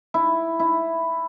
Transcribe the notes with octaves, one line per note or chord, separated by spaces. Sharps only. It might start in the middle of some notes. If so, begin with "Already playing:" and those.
E4
E4